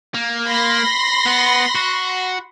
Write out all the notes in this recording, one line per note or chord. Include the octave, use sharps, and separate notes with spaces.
A#3
B5 C6 A#6
B3
F#4